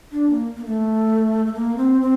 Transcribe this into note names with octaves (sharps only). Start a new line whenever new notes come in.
D4
A#3
A#3
A3
A3
A#3
C4
C4